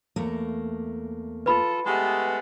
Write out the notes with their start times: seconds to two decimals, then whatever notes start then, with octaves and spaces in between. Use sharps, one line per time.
0.16 E2 A3 A#3
1.46 F4 A4 B4 B5
1.86 G#3 A3 B3 G4 A5